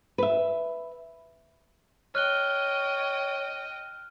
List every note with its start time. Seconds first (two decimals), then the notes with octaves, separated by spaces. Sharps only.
0.18 B4 E5
2.15 C#5 D#5 G5 F6 F#6 G7